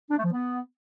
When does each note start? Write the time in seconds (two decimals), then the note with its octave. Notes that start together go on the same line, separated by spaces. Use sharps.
0.11 D4
0.18 A3
0.25 F3
0.32 B3